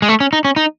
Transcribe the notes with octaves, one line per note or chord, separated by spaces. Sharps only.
G#3
A3
C#4
D#4
C#4
D#4